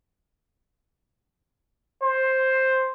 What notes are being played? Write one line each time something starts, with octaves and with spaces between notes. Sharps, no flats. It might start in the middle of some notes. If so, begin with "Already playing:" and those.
C5